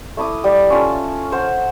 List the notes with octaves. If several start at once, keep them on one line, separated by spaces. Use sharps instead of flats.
A3 E4 D6 D#6
G3
C#4 F4 A4
C5 F#5